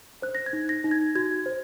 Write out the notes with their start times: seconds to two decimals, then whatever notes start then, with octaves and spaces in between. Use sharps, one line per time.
0.22 C5 F#6
0.35 A#6
0.46 G#6
0.53 D#4
0.69 A#6
0.84 D#4
0.91 G#6
1.15 F#4 G#6
1.46 C5